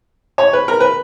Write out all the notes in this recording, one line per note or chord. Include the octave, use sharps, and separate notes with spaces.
C#5
B4
A#4
B4